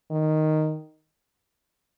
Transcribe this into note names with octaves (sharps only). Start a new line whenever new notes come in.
D#3